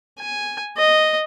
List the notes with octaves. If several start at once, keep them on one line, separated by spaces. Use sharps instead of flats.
G#5
D#5